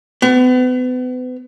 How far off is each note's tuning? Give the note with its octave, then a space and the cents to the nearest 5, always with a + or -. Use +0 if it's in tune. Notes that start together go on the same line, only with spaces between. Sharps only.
B3 +35